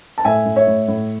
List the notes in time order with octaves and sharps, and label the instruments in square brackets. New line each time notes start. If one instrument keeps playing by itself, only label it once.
[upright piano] A5
A2 E5 G#5
A2
C#5 E5
A2
A2